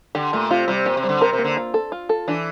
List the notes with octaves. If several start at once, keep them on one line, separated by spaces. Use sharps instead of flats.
D3 G4
A#2 A3
C3 F4
C3 G3
A#2 G4
C3
G3
D3
C3 A#4
C3
A#3
D3
F4
A4
F4
A4
E3 D4